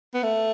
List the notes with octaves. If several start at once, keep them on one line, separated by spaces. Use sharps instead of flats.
B3
A3